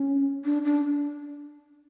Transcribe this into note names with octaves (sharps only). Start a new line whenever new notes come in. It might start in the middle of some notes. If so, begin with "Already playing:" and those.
Already playing: C#4
D4
D4